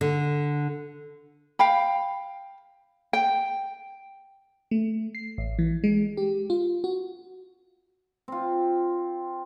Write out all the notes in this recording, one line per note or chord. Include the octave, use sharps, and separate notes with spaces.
D3
F5 G5 B5
G5
A3
C7
A1
E3
G#3
G4
F4
F#4
C4 F4